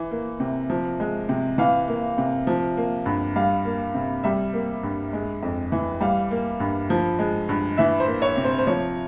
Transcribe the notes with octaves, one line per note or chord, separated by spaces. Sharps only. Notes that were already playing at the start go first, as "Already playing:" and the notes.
Already playing: E3
A#3
C3
F3
G#3
C3
E3 F5
A#3
C3
F3
A#3
G2
G3 F5
A#3
C3
G3 E5
A#3
G2
G#3
F2
E3
G3 F5
A#3
G2
F3
G#3
G2
E3 E5
C5
A#3
C#5
C3
C5
C5
F3 C#5